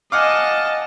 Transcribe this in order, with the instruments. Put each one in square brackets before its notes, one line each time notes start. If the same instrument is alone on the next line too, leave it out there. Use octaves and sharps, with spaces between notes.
[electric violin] D#5 A5 [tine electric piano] F5 F#5 G#5 [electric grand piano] D6 F6